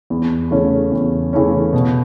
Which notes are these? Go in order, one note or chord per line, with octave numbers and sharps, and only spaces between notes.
E2
C#3 E3 A3 C#4
E2
C#3 E3 A3 C#4
B2